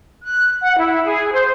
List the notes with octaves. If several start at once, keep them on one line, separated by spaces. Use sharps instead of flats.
F#6
F#5
E4
G#4
C5